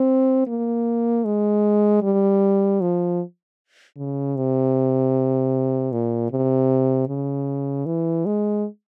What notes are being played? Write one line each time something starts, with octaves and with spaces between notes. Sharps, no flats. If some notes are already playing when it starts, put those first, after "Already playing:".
Already playing: C4
A#3
G#3
G3
F3
C#3
C3
A#2
C3
C#3
E3
G#3